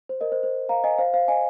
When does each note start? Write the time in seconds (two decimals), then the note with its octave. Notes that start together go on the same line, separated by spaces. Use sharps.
0.09 C5
0.21 A#4 D#5
0.32 C5
0.43 C5
0.69 F5 A#5
0.84 D#5 G#5
0.99 C5 F5
1.14 C5 F5
1.28 D#5 G#5